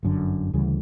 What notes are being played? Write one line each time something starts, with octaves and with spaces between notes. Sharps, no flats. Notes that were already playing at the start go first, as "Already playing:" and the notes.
G1 F#2 D3
D2 C#3 E3 G3